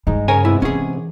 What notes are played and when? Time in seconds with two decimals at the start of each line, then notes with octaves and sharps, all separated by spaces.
0.07 G2 G#3 D#4
0.28 C#3 A#4 C#5 G#5
0.45 C3 G#3 B3 E4
0.62 E3 C#4 G#4